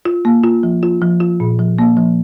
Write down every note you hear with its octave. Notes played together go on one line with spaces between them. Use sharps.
F4
A#3
F4
F3
F4
F3
F4
A#2
F3
A#3
F3